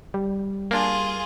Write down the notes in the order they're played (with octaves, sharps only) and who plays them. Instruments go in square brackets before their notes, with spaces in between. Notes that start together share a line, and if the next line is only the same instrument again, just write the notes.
[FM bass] G3
[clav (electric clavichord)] A#3 D4 [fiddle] F4 G#4